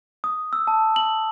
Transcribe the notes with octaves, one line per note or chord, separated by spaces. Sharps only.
D#6
E6
A5
F#7